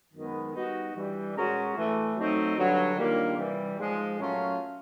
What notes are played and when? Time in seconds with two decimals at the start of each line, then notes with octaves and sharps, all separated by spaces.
0.13 F#2 D#3 G#3 B3
0.54 G3 B3 D#4 F#4
0.93 G2 E3 G3
1.34 B2 G#3 C#4 F#4 A#4
1.75 A2 E3 A3
2.16 F#3 A3 C4 D#4
2.56 G2 D3 F#3
2.96 D#3 G3 A#3 D4 F4
3.37 C3 E3 G3
3.76 G#2 F3 G#3
4.17 A#2 F#3 A3 C#4 F4